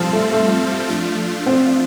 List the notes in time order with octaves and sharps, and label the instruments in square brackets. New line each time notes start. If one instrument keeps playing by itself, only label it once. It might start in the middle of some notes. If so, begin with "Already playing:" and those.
Already playing: [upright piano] F3 [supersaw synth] G3 C4 F4 A4
[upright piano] A3
A3
[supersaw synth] F3 A3 D4 F4
[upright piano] C4